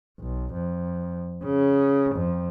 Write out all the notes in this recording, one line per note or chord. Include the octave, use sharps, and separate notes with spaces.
B1
F2
C#3
F2